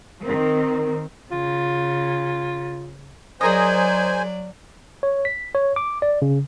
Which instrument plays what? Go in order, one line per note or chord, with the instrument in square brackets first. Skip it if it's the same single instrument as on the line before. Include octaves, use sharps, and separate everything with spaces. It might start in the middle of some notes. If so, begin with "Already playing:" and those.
[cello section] D#3 C4 [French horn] A#4
[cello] C#3 [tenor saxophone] F4
[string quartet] F#3 D5 [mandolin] G#4 A#4 D#5 [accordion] C5 G#5
[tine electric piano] C#5
B6
C#5
D6
D5
C#3